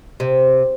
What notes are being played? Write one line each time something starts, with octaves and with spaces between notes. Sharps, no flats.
C3